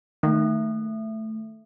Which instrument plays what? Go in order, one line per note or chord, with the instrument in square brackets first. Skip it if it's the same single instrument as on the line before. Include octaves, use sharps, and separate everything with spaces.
[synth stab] D#3 A#3 [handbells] A3